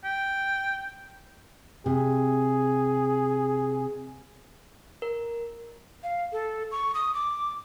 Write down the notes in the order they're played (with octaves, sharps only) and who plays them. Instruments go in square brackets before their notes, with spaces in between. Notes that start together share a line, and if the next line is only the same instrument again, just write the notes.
[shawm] G5
[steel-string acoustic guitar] C3 [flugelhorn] G#4
[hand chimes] A#4
[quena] F5
A4
C#6
D#6
D6